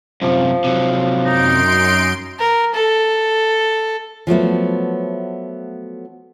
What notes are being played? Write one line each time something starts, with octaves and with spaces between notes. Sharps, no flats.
F#2 C3 F3
C3 F#3
F#2 D#4 C6 D7
A#4
A4
F3 F#3 A3 B3